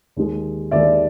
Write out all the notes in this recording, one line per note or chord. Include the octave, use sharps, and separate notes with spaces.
D#2 D#3 G#3
D#2 D#3 G#3 D5 E5